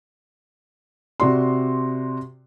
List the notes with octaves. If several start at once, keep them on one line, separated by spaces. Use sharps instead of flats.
C3 F#4 D5 C6